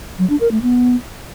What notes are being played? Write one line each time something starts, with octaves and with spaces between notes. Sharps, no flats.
F#3
D4
A#4
A3
B3